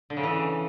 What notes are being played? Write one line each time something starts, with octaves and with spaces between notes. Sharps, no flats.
D3
C#3
E3